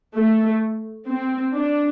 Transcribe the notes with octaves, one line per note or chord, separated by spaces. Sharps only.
A3
C4
D4